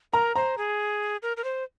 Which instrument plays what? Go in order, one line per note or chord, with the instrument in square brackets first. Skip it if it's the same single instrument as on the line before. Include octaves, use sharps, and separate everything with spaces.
[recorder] A#4 [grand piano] A#5
[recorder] C5 [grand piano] A#5
[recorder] G#4
A#4
A#4
C5